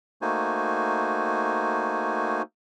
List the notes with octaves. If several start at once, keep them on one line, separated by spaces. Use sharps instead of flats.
A3 A#3 D#4 F#4 C5 G#5